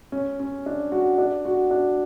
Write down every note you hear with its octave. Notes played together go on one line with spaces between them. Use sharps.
C#4
C#4
D4
F#4
D4
F#4
D4